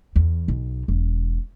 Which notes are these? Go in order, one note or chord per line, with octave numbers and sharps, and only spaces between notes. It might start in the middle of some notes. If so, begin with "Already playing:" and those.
E2
B1
E1